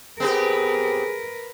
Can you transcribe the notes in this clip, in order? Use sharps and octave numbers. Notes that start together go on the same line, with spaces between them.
B3 C4 G4 G#4 A#4 B4